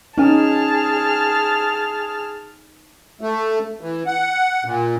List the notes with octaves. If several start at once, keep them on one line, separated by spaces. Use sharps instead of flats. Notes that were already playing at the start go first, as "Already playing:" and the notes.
C#4 D#4 G#4 G#5 A5 F6
A3
E3
F#5
A#2